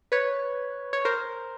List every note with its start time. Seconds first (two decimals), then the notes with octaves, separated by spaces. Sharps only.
0.12 B4 C#5
0.93 C#5
1.05 A#4 C5